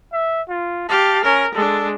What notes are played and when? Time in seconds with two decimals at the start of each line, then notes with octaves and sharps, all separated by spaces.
0.13 E5
0.48 F4
0.89 G4 F5 A5
1.24 C#4 A#4
1.54 G#3 D4 A4